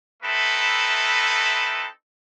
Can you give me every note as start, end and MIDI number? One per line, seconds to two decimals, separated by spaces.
0.23 1.86 57
0.23 1.86 60
0.23 1.86 63
0.23 1.86 64
0.23 1.86 69
0.23 1.86 71